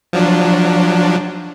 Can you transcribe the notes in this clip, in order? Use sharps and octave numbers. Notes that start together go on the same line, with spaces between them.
F3 F#3 D4